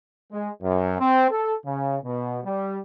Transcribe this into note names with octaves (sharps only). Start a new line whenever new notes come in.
G#3
F#2
C4
A4
C#3
B2
G3